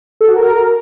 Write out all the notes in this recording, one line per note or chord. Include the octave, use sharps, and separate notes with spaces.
A4
F#4
A#4